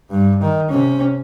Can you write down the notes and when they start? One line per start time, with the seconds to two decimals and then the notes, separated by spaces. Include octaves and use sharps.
0.10 G2
0.41 D#3
0.70 C3 C#4